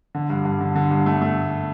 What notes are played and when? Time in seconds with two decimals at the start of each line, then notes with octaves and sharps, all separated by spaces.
0.15 D3
0.30 G2
0.45 G2
0.61 D3
0.76 D3
0.91 G2
1.06 A3
1.21 A3